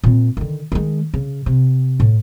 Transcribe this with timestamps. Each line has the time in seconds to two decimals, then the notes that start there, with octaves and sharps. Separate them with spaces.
0.04 A#2 C4
0.37 D3 D#3
0.72 D#3 G#3
1.14 C#3
1.46 C3
2.00 A2